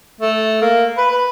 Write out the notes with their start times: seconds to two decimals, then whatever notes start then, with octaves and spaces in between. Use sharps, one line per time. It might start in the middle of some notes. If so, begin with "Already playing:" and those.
0.21 A3
0.62 A#3
0.97 B4
1.11 B4